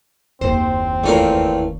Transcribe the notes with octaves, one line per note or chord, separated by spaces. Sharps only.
F#1 D#2 C4 C5
E2 A3 C#4 F4 A#4 F5